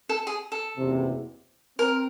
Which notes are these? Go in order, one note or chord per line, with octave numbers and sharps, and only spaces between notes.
A4
G#4
A4
F#1 E2 C3
C4 A#4